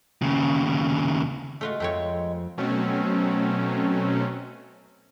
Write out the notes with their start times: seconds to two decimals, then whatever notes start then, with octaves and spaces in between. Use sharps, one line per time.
0.22 D#2 C#3
1.61 G#3 A3 F4 F#4
1.80 F2 A3 C4 C#5
2.58 B2 F#3 A3 C4 C#4